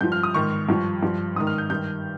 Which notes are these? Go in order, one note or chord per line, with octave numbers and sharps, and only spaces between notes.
G2 F3 G6
F6
D#6
G#2 D#3 C#6
G2 F3
G2 F3
G#2 D#3 D#6
F6
G6
G2 D#3 G6